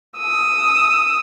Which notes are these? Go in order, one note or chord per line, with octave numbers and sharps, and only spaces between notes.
D#6 E6